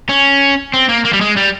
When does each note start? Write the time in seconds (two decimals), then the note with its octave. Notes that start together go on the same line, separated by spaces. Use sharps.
0.09 C#4
0.74 C4
0.89 A#3
1.05 A#3
1.13 G3
1.21 G#3
1.37 G3